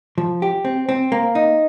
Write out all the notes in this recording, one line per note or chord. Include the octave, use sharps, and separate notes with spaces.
F3
G4
C4
C4
A#3
D#4